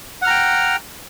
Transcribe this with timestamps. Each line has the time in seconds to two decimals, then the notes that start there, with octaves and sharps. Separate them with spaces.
0.22 F#5
0.24 F6
0.27 A#5
0.30 G5